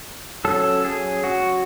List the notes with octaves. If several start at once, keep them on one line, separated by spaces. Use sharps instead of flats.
F#3 C#4 A4
G#4
F#4